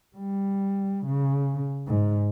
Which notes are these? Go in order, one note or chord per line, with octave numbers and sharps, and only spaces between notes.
G3
C#3
G#2